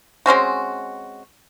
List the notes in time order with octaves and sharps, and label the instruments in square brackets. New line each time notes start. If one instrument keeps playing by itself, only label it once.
[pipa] G#3 C4 C#4 F#4